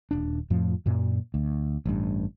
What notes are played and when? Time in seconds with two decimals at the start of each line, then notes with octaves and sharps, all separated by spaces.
0.11 D#1 D4
0.50 F2 A2 F3
0.86 F#2 A#2
1.34 D2
1.86 A1 G2